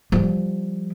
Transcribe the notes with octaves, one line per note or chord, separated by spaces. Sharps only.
F3 G3